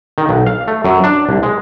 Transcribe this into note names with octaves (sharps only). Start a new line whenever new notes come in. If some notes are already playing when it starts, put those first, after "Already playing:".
D#3
B1
F5
A3
F#2
D4
C2
G#3